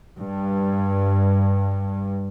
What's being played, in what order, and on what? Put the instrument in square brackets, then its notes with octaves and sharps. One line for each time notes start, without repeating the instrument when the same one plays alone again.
[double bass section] G2